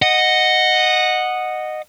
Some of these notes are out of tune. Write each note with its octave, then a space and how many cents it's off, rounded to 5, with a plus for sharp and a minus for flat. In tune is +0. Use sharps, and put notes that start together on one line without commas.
D#5 -10 F#5 -5